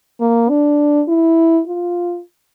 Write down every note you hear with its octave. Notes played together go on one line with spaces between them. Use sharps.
A#3
D4
E4
F4